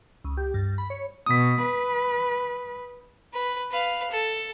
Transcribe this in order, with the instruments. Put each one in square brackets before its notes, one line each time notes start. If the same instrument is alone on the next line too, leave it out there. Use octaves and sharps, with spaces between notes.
[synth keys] C#2
G4
G2
B5
C#5
[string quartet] B2 [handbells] D#6 B6
[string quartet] B4
[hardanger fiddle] B4
B4 F5
A4